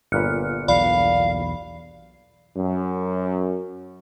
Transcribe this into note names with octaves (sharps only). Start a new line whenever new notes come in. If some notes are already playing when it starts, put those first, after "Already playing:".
G1 A#2 B4 F6 F#6 C#7
B1 E2 D5 F5 B5
F#2